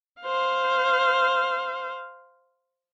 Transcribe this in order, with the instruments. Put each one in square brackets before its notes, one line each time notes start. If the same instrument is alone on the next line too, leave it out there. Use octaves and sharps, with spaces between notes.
[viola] C5 F5